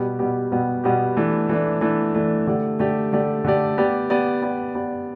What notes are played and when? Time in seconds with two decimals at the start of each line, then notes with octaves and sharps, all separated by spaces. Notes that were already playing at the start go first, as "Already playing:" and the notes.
Already playing: B2 G3 B3 G4
0.19 B2 G3 B3 G4
0.52 B2 G3 B3 G4
0.84 B2 G3 B3 G4
1.16 E3 A3 D4
1.49 E3 A3 D4
1.81 E3 A3 D4
2.14 E3 A3 D4
2.47 D3 A3 G4 D5
2.79 D3 A3 G4 D5
3.13 D3 A3 G4 D5
3.44 D3 A3 G4 D5
3.78 B3 G4 D5
4.10 B3 G4 D5
4.42 B3 G4 D5
4.75 B3 G4 D5